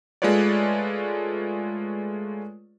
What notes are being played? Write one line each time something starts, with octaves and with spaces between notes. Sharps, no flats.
G#3 A3 F4 B4 C#5 D5